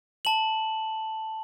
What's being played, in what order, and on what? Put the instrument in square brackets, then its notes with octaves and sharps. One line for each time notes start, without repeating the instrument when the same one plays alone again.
[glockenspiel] A5 F#7